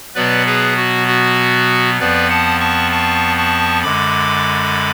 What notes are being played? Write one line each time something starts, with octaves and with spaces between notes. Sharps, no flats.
B2 F#3 B3 B4 D5
G#4 B4
F#4
F#4
F2 F3 B3 B4 D5
F#5 A5
A5 C#6
A5 C#6
A5 C#6
F#2 D3 G#3 B5 D6